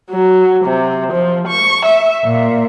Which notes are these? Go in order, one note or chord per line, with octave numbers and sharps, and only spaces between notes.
F#3
C3
F3
C#6
E5
A#2